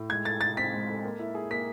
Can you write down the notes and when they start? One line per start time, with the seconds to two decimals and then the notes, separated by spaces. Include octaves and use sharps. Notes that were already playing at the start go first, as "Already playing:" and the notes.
Already playing: A2
0.10 G#3 G#6
0.25 A4 A6
0.41 A4 A6
0.57 C4 B6
0.73 G#3
0.88 A4
1.04 A#3
1.19 E4
1.35 G#4
1.51 A#3 B6